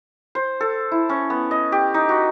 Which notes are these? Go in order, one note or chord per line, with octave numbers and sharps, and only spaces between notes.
C5
A4
E4
C#4
B3
D#5
G4
D#4
F#4